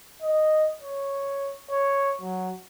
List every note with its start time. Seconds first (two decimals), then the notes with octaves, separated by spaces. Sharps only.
0.22 D#5
0.81 C#5
1.70 C#5
2.21 F#3